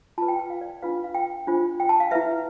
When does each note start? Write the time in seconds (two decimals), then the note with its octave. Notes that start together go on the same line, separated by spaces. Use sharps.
0.18 F4 B4 A5
0.28 G5
0.39 G5
0.50 F5
0.61 D5
0.82 D4 F4 B4 F5
1.04 F5
1.14 G5
1.47 D4 F4 C5
1.80 G5
1.89 A5
2.00 F5
2.11 E4 B4 E5